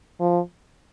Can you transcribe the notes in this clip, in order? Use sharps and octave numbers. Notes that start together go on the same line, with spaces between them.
F3